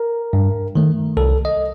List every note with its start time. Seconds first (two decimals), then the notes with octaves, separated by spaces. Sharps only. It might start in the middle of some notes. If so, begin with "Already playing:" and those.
Already playing: A#4
0.33 G2
0.75 D#3 A3
1.17 C2 A4
1.45 D#5